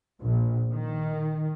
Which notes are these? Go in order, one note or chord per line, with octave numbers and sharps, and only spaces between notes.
A#1
D#3